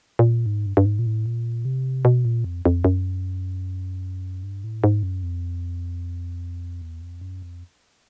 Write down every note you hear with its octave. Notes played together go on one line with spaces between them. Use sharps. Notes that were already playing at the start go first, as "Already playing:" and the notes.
A#2
G#2
G2
G2
G#2
A#2
A2
A#2
C3
B2
A#2
F2
F2
F#2
G2
A2
G#2
F#2
F2
E2
F2
F#2
F2